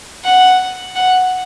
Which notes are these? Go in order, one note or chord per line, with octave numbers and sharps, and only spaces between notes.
F#5
F#5